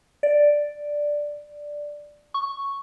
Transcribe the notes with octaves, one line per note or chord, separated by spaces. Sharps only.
D5
C#6